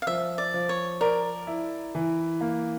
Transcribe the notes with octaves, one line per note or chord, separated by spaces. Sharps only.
F5
F3 E5
D5
F3
C#5
A#4 D5
E4
E3
A#3